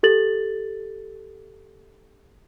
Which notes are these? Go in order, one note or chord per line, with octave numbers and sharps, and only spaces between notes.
G4 A4 A6 F#7